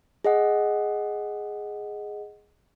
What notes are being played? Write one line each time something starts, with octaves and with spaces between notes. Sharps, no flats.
G#4 D#5 F#5